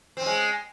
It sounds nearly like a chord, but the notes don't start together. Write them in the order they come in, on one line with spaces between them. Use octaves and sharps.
C4 C#4 G#3